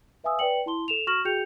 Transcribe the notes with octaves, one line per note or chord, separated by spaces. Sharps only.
B4 E5 F5 G#5 D#6 E6
B4 C#5 D5 G5 C#7 F#7
E4 A5 C6 G7
A4 E7 F7
F#4 C#6 F6 A#6 E7 F#7
F#4 G#4 G5 G6 C#7 F7